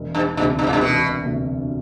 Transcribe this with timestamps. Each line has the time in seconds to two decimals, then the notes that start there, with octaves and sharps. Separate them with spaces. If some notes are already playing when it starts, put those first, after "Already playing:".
Already playing: E1
0.15 G2
0.37 D2 G2
0.40 C3
0.59 G2
0.67 A2
0.73 G2
0.81 E1 B2
1.25 D2 C3